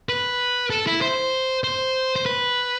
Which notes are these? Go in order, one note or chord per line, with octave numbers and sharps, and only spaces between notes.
B4
A4
E4
C5
C5
C5
B4